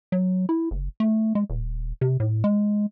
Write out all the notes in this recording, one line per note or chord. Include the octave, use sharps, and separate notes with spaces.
F#3
E4
F#1
A3
G#3
D#1
C3
A2
G#3